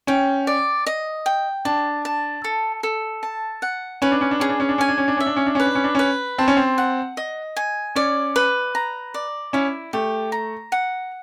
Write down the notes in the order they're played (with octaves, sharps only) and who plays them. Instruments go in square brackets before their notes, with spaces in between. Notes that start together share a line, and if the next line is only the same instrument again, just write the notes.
[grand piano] C#4 [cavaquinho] G5
[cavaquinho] D5
D#5
G5
[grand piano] D4 [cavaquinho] A5
[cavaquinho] A5
A4
A4
A5
F#5
[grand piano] C#4 [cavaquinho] B4
[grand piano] D4
C#4
D4
[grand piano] C#4 [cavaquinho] G#4
[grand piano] D4
C#4
D4
[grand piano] C#4 [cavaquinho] G#5
[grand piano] D4
C#4
D4
[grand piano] C#4 [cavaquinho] E5
[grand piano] D4
C#4
D4
[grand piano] C#4 [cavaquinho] B4
[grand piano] D4
C#4
D4
[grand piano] C#4 [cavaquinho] B4
[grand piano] C4 [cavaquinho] A5
[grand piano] C#4
C4
[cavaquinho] F#5
D#5
G#5
[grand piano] C#4 [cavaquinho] D5
[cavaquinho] B4
A#5
D5
[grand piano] C#4 [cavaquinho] E4
[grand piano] A3 [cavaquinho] G4
[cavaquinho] A#5
F#5